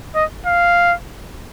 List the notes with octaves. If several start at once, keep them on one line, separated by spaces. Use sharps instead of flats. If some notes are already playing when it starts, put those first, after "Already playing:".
D#5
F5